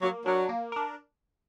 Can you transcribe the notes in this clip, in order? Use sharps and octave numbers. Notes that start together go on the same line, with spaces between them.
F#3 A#3
F#3 D4 A#4
A#3
D4 A#4